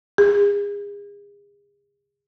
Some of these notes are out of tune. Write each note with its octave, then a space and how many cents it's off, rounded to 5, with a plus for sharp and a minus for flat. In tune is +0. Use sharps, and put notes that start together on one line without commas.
G#4 -35